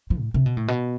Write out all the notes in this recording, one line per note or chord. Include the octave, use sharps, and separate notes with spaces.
F3
A2
C3
B2
A2
B2